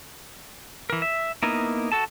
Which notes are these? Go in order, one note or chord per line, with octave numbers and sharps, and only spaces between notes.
E3 A#4
E5
A#3 B3 D#4 E4 A#4
F#4 A4 A5